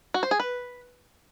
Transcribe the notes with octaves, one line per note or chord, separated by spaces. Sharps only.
F#4
C5
G#4
B4